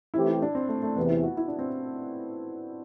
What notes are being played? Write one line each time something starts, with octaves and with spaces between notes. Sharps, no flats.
E3 A3 C4 E4 G4
E4
D4
C4
A3
A3
E2 C3 E3 B3
E4
F#4
E4
D4
C4